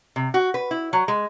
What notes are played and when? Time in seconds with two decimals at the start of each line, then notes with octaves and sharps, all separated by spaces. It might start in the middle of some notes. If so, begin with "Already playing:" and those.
0.16 C3
0.34 F#4
0.54 B4
0.71 E4
0.93 F#3
1.08 G#3